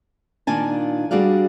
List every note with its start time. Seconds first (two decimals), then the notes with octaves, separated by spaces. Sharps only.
0.47 A#2 D#3 D4 F4 G#5 A5
1.11 G3 D4 F#4 G#4 D5 F5